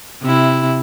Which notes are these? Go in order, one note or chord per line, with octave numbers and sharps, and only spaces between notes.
C3 E4